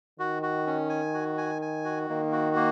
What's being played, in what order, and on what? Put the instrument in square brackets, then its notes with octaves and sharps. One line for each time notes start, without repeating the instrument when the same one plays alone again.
[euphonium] D#3 [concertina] F#4
[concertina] F#4
C#4
G#5
F#4
G#5
G#5
F#4
[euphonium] D#3 [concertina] A#3
[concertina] F#4
A#3